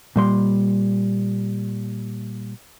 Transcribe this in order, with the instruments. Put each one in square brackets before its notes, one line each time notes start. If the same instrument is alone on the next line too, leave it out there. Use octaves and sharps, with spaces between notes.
[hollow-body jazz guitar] A#2 G3 C6